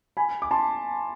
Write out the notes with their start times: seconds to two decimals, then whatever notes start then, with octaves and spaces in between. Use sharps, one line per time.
0.17 G#5 B5
0.42 D6
0.51 A5 C6